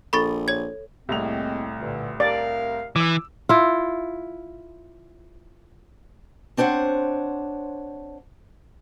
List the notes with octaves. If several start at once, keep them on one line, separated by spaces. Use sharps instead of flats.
A#1 A4 B5 C#6 A6
C#5 G#6
C2 A2 G#3 A#3 C4 F7
G2 A#2 D3
A#4 D5 F5
E3 D6 E6
E4 F4
C4 D4 C5 C#5 F#5